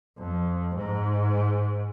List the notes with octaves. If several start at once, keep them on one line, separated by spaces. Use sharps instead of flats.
F2
G#2